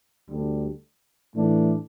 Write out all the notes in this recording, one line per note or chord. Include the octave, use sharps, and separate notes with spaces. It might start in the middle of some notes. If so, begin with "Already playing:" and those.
D2 D3 G3 D4
A2 E3 A3 D4